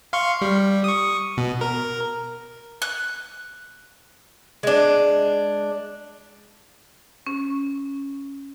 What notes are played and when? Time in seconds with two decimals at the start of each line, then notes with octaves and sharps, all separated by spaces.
0.13 F5 C6 C#6
0.41 G3
0.84 C#6 D#6
1.37 B2
1.61 A#4
2.82 F#6
4.63 G#3 D4
7.27 C#4